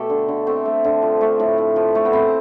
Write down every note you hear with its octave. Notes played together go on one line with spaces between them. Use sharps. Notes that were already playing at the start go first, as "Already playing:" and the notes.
Already playing: B2 A3 G4 A4
D3
D3
A3 C4
A3
D3
F3
A3
A2
A2
F3
A3
B3
E3 C4